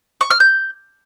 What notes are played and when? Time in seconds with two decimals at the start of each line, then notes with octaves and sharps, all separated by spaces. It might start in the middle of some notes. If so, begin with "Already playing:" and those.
0.21 C#6
0.31 F6
0.40 G6